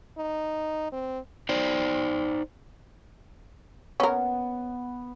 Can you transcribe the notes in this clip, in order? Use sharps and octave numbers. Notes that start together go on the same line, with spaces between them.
D#4
C4
D#4 C5 D5
B3 C#4 A#4